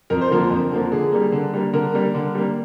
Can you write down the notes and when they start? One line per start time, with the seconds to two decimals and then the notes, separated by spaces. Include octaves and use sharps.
0.10 F2 A#4
0.21 C5
0.31 D3 F3 A#3 A#4
0.50 F2
0.72 D3 F3 A#3
0.92 D3 G#4
1.12 G3 A#3
1.32 D3
1.54 G3 A#3
1.73 D3 A#4
1.94 G3 A#3
2.15 D3
2.35 G3 A#3